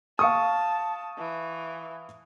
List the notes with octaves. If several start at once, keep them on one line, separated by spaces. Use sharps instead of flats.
F5 A5 C#6 D#6
E3